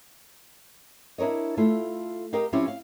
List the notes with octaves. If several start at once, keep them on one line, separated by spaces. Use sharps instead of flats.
D4 E4 A#4 C#5 D#5
A3 E4 F4 A4
G4 A#4 D#5 F5 G5
F3 C4 C#4 E4 G4
F5